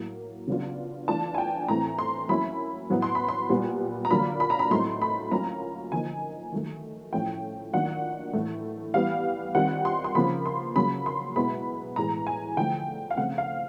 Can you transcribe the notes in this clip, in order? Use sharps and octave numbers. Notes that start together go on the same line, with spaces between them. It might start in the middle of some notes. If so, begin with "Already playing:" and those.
Already playing: A2 F#3 A#3
C#3 F#3 B3 D4 F4
E3 A3 D4 F4 A5
G#5
G5
A2 E3 A3 C4 A#5
C6
F#3 A#3 C#4 E4 B5
A2 F#3 B3
C6
B5
C6
A#2 G3 B3
A#5
D3 F#3 A#3 D4 F4 B5
B5
A#5
B5
A2 F#3 A3 C4 D#4 C6
B5
F#3 A#3 C#4 F4 A#5
D3 F3 A#3 D#4 G#5
D#3 F#3 A3
A2 F3 A3 C#4 E4 G5
D#3 F#3 A#3 D4 F4 F#5
A2 E3 A3
E3 G3 B3 F5
D#3 G3 C4 F4 F#5
C6
C6
C#3 F3 A#3 B5
C6
C#3 F#3 A#3 B5
C6
B2 G#3 B3 E4 B5
A2 E3 G#3 A#5
G#5
D3 F3 A3 G5
F5
C#3 F3 A3 C4 F#5
F5